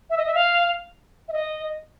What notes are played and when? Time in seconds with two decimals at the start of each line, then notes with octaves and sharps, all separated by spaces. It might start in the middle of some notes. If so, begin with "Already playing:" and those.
0.10 E5
0.18 D#5
0.26 E5
0.35 F5
1.28 E5
1.32 D#5